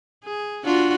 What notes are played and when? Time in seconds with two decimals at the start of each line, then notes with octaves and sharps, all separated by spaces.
0.24 G#4
0.64 D4 F4 F#4